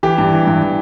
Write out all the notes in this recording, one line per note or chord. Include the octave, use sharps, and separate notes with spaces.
E3 G4
G2
E3
G2
E3